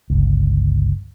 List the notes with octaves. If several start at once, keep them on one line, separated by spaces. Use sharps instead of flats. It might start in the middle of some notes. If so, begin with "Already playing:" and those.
G1 C#2